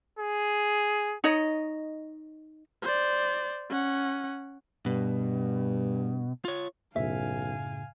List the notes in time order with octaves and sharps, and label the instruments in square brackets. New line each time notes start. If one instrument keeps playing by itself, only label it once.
[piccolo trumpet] G#4
[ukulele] D#4 C#5 D#5
[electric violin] C5 D5
C#4 F#5
[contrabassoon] G2 [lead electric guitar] B2
[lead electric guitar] F4 C#5
[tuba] B1 [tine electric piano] F#2 A2 C#3 [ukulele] E5 [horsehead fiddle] F5 G#5